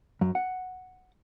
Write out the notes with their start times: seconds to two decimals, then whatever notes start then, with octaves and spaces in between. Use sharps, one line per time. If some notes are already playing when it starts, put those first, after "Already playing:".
0.21 F#2
0.35 F#5